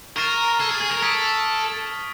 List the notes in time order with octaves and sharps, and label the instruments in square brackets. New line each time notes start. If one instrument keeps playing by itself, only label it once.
[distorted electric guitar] A#4 [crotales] C#6 F6 A6 C7 E7
[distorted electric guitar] A4 [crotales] F6 G#6 C7 E7
[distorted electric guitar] G#4
G#4
A#4
[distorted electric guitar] A4 [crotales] D#6 G#6 B6 D7